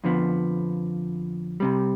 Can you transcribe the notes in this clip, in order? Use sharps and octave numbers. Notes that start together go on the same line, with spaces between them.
F2 D3 F3 B3
C2 C3 G3